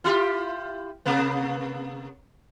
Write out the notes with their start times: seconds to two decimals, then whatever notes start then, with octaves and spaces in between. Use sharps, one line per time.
0.04 E4 F4 G4
1.06 C3 A#3 B3